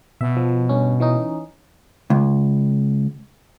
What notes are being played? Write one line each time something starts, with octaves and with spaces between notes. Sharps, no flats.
B2 E5
F3
G2 C#4
E3 C#4 D#4
C#2